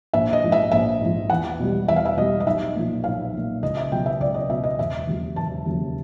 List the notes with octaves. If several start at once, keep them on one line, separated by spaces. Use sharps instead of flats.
A#1 E5
D#5
G#2 F3
E5
A#1 E5
G#2 F3
E2 F#5
B2 G3
E2 E5
F5
E5
B2 G3 D#5
D#5
B1 E5
A#2 F3
B1 F5
A#2 F3
C#2 D#5
E5
B2 F#3 G5
E5
C#2 D5
D#5
B2 F#3 E5
D#5
E1 E5
D#2 C#3 F#3
E1 A5
D#2 C#3 F#3